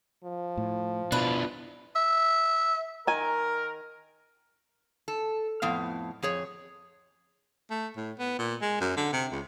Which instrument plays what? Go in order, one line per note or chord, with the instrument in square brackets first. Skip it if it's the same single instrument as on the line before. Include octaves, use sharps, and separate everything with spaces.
[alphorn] F3
[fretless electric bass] A2
[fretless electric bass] B2 [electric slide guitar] D4 E4 F4 [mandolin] B4
[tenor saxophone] E5
[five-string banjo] D#3 G#5 [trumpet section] A#4
[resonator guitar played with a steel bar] A4
F2 A2 B3 F5
F2 G#4 C#5
[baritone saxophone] A3
A2
B3
A#2
G#3
F#2
D3
C3
C#2